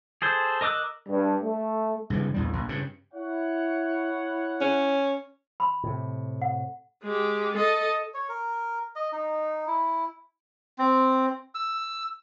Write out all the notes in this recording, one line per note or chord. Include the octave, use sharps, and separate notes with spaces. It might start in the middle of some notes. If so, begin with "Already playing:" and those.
G#4 A4 C5
A#4 D#5 D6 E6 F#6
G2
A3
G2 C#3 E3
A#1 E2 G3
A#1
G2 C#3
E4 C#5 F#5
C#4
B5 C6
A2 C3
F#5
G#3 G4
A4 D#5
C#5
A#4
D#5
D#4
E4
C4
E6